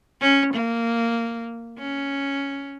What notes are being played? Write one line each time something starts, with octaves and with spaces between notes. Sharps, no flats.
C#4
A#3
C#4